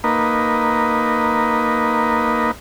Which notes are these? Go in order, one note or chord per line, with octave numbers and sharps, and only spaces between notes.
A#3 D#4 B4